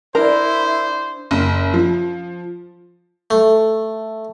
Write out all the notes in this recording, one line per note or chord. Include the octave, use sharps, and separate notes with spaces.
D4 E4 A#4 C5
F#1
F3
A3